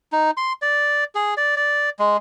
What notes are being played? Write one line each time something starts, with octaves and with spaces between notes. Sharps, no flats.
D#4
C6
D5
G#4
D5
D5
G#3